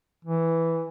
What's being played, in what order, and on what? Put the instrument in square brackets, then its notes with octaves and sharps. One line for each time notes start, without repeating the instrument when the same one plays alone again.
[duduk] E3